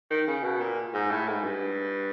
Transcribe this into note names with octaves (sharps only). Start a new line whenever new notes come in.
D#3
C#3
B2
A#2
G#2
A2
G#2
G2